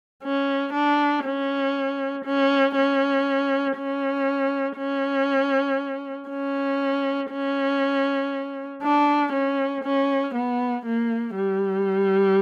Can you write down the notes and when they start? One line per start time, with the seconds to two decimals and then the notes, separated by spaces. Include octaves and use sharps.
0.24 C#4
0.73 D4
1.24 C#4
2.25 C#4
2.76 C#4
3.77 C#4
4.78 C#4
6.30 C#4
7.31 C#4
8.83 D4
9.33 C#4
9.84 C#4
10.35 B3
10.85 A#3
11.36 G3